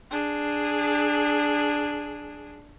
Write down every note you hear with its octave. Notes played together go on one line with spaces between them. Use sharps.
D4 G#4